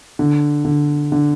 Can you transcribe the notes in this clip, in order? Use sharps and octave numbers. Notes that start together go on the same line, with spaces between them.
D3
D3
D3